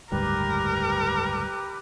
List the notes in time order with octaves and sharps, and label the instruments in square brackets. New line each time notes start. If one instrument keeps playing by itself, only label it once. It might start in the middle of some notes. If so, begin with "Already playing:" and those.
[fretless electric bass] F#1 D2 G#2 [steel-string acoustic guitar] G3 [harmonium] G4 B4 [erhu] A#4